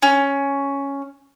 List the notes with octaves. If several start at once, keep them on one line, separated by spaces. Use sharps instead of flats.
C#4